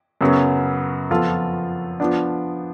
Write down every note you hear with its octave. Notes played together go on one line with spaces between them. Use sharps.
F#2 C#3 F#3 B3
F2 F3 B3 F4 A4
F3 B3 D4